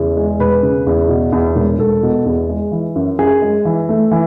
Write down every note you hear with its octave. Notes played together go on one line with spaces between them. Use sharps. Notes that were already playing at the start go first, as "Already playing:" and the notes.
Already playing: E2 C#3
G#3
E1 B4
C#3
E2
B2
E2
E1
E1 A4
B2
E2
G#3
E3
F#2
F#2 G#4
G#3
E3
A3
E3